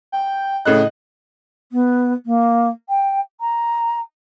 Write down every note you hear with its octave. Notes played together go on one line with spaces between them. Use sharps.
G5
A2 C#3 D#5 F#6
B3
A#3
G5
A#5